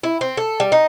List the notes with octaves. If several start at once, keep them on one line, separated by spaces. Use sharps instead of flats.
E4
C4
A4
G3
D#4